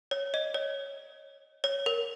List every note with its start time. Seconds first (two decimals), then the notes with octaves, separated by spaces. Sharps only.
0.11 C#5
0.34 D#5
0.54 C#5
1.64 C#5
1.86 A#4